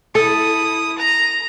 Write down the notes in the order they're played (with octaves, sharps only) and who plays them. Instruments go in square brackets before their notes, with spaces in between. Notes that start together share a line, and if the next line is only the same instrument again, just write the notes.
[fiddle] E4 D#6 [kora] A4
[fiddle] A#5